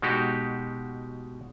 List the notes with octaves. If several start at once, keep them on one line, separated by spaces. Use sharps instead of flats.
B2 G#3 D#4 F#4 G4